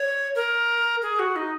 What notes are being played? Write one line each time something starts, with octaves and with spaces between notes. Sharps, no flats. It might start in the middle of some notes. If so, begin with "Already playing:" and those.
Already playing: C#5
A#4
G#4
F#4
D#4